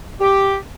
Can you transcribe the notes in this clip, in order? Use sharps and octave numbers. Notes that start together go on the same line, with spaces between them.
G4